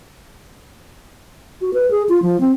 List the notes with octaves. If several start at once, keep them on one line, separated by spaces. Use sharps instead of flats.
F#4
B4
G#4
F4
F3
C4